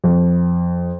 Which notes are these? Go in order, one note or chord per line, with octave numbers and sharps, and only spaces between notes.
F2